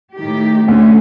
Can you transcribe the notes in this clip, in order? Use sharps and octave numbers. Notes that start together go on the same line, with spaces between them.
A2 D#3 G4
D2 D3 A3 C#4